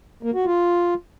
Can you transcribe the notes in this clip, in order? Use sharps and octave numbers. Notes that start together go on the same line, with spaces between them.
A#3
F#4
F4